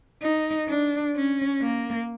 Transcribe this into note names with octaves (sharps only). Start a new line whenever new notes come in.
D#4
D4
C#4
A#3